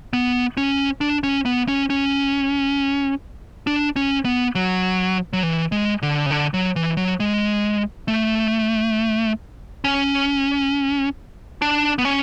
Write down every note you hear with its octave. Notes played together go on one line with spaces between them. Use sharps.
B3
C#4
D4
C#4
B3
C#4
C#4
D4
C#4
B3
F#3
F#3
E3
G#3
D3
C#3
D3
F#3
E3
F#3
G#3
A3
C#4
D4
B3
C#4